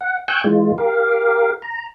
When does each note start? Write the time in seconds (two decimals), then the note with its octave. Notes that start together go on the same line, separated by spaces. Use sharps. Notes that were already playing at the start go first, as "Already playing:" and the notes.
0.01 F#5
0.28 G5 G#5 C#6 E6 F#6 G6
0.44 E3 G#3 F4
0.78 G4 A#4 F5
1.62 A#5